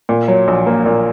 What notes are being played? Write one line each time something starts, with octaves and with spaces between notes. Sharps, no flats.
A#2
F#3
A#1
A#3
A#2